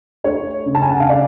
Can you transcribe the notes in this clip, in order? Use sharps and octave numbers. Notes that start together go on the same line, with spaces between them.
A3 C#5
C#3
A5
G#5
F#5
F5
C#3 D5